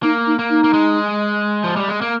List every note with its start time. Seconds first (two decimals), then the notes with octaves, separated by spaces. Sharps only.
0.03 A#3 D#4
0.27 D#4
0.39 A#3
0.50 D#4
0.64 A#3
0.73 G#3
1.64 F3
1.76 G3
1.88 G#3
2.01 A#3